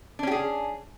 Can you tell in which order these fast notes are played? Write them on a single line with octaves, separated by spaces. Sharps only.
D4 C#4 G4 G#4